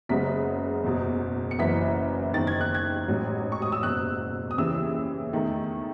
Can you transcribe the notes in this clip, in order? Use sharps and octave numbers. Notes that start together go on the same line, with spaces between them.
F#1 F#2 C#3 G#3 B3 B6
F#1 E2 B2
C#7
F#1 F#2 E3 B3 B6
F#1 E2 D#3 A6
G#6
F#6
G#6
A1 G#2 F#3
C#6
D#6
E6
F#1 E2 B2 F#6
D#6
D#2 C#3 E3 E6
E2 D#3 A3